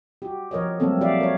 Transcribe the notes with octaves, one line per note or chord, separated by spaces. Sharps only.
F#4 G4
F3 A#4 C#5 D#5
F#3 G3 A3 A#3 C4 A4
F3 F#4 G4 D5 E5 F5
A#4 C#5